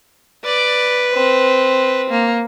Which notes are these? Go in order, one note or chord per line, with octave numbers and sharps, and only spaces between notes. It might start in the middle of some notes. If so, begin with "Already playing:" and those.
B4 D5
C4
A#3